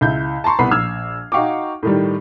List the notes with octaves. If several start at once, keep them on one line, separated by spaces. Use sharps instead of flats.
C#2 E4 G6
A5 A#5 C6 C#6
C2 B3 B5 C7
A#1 E6 F6 G#6
D#4 F#4 F5 G5 C#6 D6
A2 D#3 G3